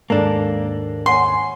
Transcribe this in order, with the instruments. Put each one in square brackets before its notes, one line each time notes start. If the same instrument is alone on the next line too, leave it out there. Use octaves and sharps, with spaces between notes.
[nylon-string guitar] D#2 G#2 [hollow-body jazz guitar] A#3 D4 [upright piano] A4
[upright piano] C#5 F#5 G#5 [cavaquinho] C6